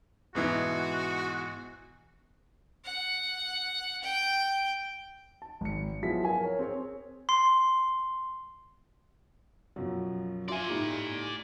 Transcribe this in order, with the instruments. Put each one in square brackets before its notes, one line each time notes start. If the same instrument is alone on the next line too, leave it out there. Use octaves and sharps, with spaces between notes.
[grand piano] G#2 B2 E3 [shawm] F#4
[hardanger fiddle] F#5
G5
[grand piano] A5
G#1 C#7
F3 F#3 B3 E4 G#4 B6
A#4 F5 G#5
A#4 C#5
C4 G#4 C#5
[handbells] C6
[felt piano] F#2 B2 F3
[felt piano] F4 E5 C6 [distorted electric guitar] D5 G#5
[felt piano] A2 D#4 G4